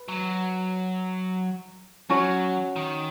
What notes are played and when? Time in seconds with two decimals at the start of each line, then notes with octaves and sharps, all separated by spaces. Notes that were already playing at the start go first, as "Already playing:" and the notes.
Already playing: B4
0.09 F#3
2.09 F#3 C#4 F#4 C#5
2.76 D#3